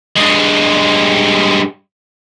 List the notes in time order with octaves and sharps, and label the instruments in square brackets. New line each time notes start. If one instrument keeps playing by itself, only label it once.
[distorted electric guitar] G2 G#3